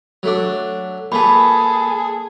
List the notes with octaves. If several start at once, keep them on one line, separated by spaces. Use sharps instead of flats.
F#3 A3 D4
A#2 G#4 A4 B4 B5